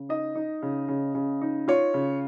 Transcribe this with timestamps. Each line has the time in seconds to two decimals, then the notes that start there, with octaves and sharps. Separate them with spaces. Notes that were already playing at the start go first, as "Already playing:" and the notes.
Already playing: C#3
0.09 D#4 D#5
0.35 D#4
0.62 C#3
0.88 C#3
1.15 C#3
1.42 D#4
1.68 F4 C#5
1.94 C#3